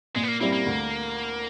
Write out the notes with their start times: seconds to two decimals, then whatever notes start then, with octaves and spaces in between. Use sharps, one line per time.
0.16 A#2 G#3
0.23 B3
0.28 A#3
0.41 G3 A#3 C4 E4
0.53 A#3
0.66 D2